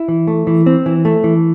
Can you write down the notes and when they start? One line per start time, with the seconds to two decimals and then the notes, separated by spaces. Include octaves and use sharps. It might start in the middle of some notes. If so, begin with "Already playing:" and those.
Already playing: E4
0.08 E3
0.27 A3
0.47 E3
0.66 C4
0.86 E3
1.05 A3
1.24 E3